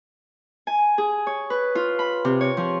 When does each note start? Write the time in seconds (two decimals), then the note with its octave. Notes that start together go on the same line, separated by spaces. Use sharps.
0.67 G#5
0.98 G#4
1.27 C#5
1.50 B4
1.75 F4
1.99 B5
2.25 C3
2.41 C#5
2.57 F3